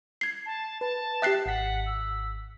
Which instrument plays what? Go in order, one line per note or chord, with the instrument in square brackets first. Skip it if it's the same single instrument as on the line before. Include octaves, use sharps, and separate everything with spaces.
[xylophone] G#6 C7
[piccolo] A5
[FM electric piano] B4 [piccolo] A5
[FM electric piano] G4 G5 [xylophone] E5 F#6 C7
[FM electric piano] G#1 B6 [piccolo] F#5
[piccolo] E6